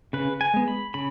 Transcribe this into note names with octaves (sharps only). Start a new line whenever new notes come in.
C#3 B4
G#5
G#3 B3
B5
C#3 B5